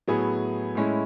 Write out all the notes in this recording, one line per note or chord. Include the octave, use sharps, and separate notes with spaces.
A2 F#3 B3 E4 G#4
A2 G#3 C#4 E4